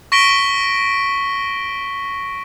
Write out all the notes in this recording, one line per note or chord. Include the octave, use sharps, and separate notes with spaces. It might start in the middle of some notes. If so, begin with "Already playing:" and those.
C#6 A#6 B6 D7 G7